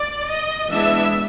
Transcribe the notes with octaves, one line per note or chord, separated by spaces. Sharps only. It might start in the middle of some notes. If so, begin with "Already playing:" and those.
Already playing: D5
D#5
E3 G#3 B3 D4 E5